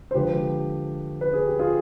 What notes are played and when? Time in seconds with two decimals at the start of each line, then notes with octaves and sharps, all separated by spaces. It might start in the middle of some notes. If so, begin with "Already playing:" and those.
0.11 C5
0.14 D3 F3 G#3 G4 B4
1.21 B4
1.34 G#4
1.47 G4
1.59 F4 G#4